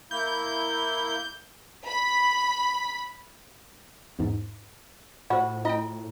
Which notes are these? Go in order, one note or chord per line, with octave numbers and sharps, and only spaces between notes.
A#3 E4 G6
B5
E2 G#2
A2 F4 F#4 C5
E4 F4 D#5 G5